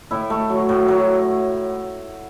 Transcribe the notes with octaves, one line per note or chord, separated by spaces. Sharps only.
A2 E4
A3
F#3
A2
F#3